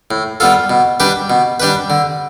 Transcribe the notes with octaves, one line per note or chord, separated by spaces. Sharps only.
A2
G3 B3 F4 A4
B2
G3 D4 G4 B4
B2
G3 D4 G4 B4
D3